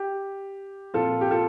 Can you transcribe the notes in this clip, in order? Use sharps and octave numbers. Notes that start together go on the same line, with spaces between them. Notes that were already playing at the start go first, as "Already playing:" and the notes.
Already playing: G4
A#2 F3 C4 F4 A4
G4
F4 A4